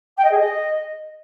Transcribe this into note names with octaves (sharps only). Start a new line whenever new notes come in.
G5
D#5
G#4
D#5